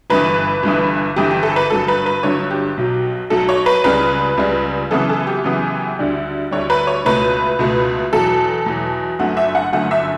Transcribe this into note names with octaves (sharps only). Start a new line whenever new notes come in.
G1 G2 E3 B4
G1 G2 E3
G1 G2 E3 G4
G4
A4
B4
G1 G2 D3 F#3 A4
B4
B4
G1 G2 D3 F#3 C#5
G4
B1 B2 F#3
B1 B2 F#3 A4
C#5
B4
C#2 C#3 G3 B4
C#2 C#3 G3
F#2 C#3 E3 B3 A4
A4
G4
F#2 C#3 E3 B3
D2 D3 G3
D2 D3 G3 C#5
B4
C#5
C#2 B2 A3 B4
C#2 B2 A3
E2 B2 F#3 A4
E2 B2 F#3
G1 F#2 D3 A3 F#4
E5
F#5
G1 F#2 D3 A3 F#5
E5